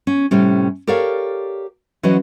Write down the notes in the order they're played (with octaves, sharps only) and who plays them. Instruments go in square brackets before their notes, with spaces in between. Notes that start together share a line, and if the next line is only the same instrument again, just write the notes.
[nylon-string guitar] C#4
A2 C3 G3 C#4
G4 A4 A#4 C#5 D5 F5
E3 F#3 C#4 F#4 C5 D#5